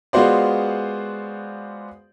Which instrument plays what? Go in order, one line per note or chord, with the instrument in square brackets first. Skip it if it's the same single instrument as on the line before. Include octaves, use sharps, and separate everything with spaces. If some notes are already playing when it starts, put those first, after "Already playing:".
[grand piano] G#3 B3 F4 F#4 C5 D5